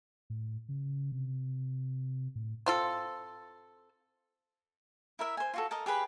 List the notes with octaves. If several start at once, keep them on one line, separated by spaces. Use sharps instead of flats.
A2
C#3
C3
A2
C4 F4 A4
E4 A#4 E5
C5 G#5
F4 F#4 A4
A4 A#4 D#5
G4 G#4 B4 B5